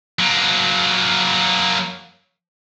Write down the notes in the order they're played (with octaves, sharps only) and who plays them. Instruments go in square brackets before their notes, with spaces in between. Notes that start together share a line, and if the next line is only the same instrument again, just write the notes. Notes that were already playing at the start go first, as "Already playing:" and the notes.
[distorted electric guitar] F#3 A#3